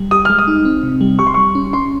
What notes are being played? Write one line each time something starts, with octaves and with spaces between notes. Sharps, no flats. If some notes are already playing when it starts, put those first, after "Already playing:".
Already playing: G3
G4 D#6
G#3 F6
D#6
D#4
C4
C3
G3
G4 C#6
C6
G3 C#6
C#4
C#4 C6